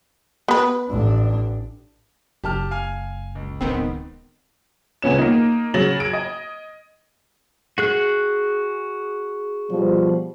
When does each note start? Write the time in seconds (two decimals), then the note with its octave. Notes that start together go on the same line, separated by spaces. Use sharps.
0.48 B3 B4
0.90 A1 D4
2.44 F#1 G4 A5 F6
2.71 F5 G#5 F6
3.35 C#2
3.61 D1 D#3 B3 C4
5.02 C#2 B3 C#4 E7
5.19 A#3 D#4
5.74 C#3 F#3 A6 A#6 E7 F#7
6.00 G#6 D7
6.13 D#5
7.78 F#4 G#4 F#6
9.71 B2 F3 G3